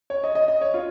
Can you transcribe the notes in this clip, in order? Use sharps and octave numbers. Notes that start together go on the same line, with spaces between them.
C#5
D#5
D#5
D#5
C#5
F4